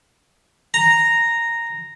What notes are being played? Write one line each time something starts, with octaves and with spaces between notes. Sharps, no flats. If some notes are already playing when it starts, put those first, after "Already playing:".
A#5